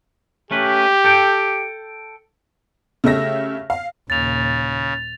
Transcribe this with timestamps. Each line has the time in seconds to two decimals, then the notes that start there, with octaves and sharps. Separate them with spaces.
0.51 A3 C#4 G4 B4
1.05 A4 G5
3.04 C#3 A3 G4 E5 A#6
3.70 F5
4.10 D#2 A#2 C#3 A6 F7